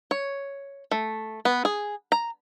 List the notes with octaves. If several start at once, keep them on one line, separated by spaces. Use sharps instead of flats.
C#5
A3
B3
G#4
A#5